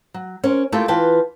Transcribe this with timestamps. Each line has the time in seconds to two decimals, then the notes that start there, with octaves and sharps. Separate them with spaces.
0.14 F#3
0.44 C#4 A#4 C5
0.72 A3 A#3 E4 F4 G4 A4
0.88 E3 F4 B4 G5 A5